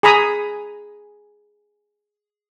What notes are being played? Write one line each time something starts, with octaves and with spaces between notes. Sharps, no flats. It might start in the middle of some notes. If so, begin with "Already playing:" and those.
G#4 G#5 A#5 B5 D#6